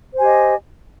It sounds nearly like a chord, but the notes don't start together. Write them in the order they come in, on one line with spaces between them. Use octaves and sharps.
C5 G#5 G4 D#5